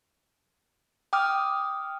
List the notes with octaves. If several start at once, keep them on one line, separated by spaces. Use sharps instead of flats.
G5 D6 D#6 F6